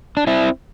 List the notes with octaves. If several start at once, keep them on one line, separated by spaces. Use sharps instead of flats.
D4
C4 E4